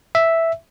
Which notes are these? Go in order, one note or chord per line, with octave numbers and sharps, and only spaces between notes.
E5